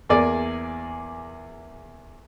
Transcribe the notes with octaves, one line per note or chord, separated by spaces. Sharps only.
E2 A#3 G#4 D5